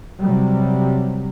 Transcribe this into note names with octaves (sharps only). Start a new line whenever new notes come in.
C3 F#3 G3